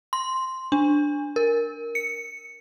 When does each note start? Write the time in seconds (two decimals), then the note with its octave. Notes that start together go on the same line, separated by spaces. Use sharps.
0.13 C6
0.72 D4
1.36 A#4
1.95 C#7